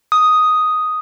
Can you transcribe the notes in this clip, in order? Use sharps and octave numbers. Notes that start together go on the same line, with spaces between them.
D#6